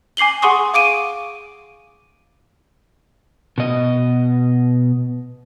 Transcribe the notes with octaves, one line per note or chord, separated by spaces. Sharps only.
G#5 D6 C7 F#7 G7
G#4 F#5 G#5 C6 C#6 D#6
F5 D6 D7 D#7
B2 D#5